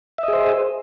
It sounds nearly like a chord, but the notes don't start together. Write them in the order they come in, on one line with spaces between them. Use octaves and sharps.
E5 D#5 G#4 C5